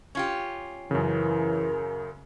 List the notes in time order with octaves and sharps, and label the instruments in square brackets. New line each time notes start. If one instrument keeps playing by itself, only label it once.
[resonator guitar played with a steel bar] C#4 F4 G4
[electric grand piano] F#2 C#3 [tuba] E3 [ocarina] A#4